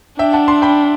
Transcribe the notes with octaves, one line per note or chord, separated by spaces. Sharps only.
D4 E5 G5
F#5 A5
A5 C6
G5 B5